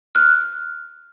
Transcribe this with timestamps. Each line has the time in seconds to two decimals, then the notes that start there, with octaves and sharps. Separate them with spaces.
0.15 F6 F#6